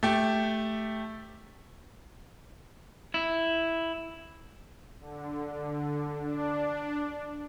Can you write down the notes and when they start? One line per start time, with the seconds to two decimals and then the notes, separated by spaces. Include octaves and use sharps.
0.03 A3 G4
3.14 E4
4.99 D3
6.21 D4